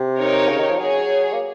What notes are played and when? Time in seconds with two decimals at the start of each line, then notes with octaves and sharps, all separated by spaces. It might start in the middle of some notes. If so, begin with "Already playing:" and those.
Already playing: C3
0.18 D#4 A#4 C#5
0.49 C#3
0.59 D#3
0.70 F3
0.79 F#3 G#4 C#5 G#5
1.33 A#3